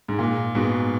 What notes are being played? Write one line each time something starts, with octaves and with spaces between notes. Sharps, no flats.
G#2
A#2
G#2 B2